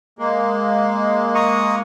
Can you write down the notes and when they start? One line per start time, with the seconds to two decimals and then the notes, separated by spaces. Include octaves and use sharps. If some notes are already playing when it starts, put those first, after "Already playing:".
0.19 G#3 A#3
1.35 A#5 C#6 D#6